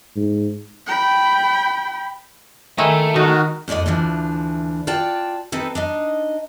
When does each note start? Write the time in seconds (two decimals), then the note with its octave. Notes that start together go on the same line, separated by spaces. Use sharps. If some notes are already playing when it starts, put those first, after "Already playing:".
0.16 G#2
0.86 G5 B5
2.78 D#3 G#3 A3 E4
3.16 D#3 D#4 F#4
3.68 F2 A2 D5 D#5 F#5
3.86 D2 E3 F3 D4
4.87 F4 D5 F#5 G5 A5
5.52 C4 D#4 A4 B4
5.75 D4 D#4 D#5